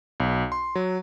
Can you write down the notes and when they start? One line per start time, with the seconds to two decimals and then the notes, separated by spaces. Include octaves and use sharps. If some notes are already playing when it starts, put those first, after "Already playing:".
0.20 B1
0.52 C6
0.75 F#3